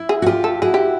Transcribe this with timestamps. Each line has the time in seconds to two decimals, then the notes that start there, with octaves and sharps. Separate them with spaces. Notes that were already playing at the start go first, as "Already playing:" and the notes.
Already playing: E4
0.09 G#4
0.22 F#4
0.26 F4 G4 G#4
0.44 A4
0.62 E4 F#4 G#4
0.74 G4